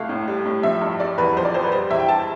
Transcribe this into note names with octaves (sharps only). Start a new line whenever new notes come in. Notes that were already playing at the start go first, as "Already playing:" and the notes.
Already playing: C2 A3 F5
A2
G3
A2
F3 E5
G2
G3 D5
E2 B4
F3 C5
D5
F2 C5
B4
G3 C5
E2 E5
G5
G3 A5